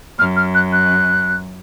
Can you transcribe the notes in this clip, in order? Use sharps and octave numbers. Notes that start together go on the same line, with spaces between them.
F#2 F6
F6
F#6
F#6